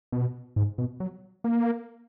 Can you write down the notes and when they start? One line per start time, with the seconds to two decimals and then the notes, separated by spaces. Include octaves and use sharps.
0.12 B2
0.56 G#2
0.78 B2
1.00 F#3
1.44 A#3